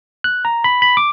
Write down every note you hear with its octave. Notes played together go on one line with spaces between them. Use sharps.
F#6
A#5
B5
B5
D6